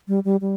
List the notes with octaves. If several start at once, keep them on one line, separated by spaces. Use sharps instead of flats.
G3
G3
G3